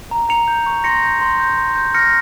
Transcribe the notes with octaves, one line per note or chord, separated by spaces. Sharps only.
A#5
A#5 C#7 F7
G6
C#6
C6 A#6 C#7
G6
C6
G6
C6
G6
F6 A#6 C#7